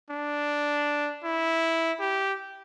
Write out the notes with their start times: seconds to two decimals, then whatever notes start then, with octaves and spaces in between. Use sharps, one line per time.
0.10 D4
1.24 E4
2.00 G4